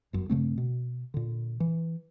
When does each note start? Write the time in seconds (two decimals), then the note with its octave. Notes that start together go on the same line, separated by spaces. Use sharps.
0.13 G1 F#2
0.30 G2 C#3 A3 C4
0.58 B2
1.14 A#2 D3
1.60 E3